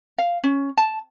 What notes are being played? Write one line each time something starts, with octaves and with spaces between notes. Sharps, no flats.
F5
C#4
A5